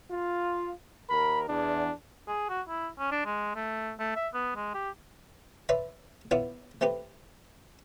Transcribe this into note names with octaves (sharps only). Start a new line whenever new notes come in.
F4
D#2 A#4 B5
E2 D4
G#4
F#4
E4
C#4
D4
G#3
A3
A3
E5
B3
G#3
G4
B4 C#5 D5 E5 C6
B3 E4 F4 C#5 D5 E5
A3 C4 G4 B4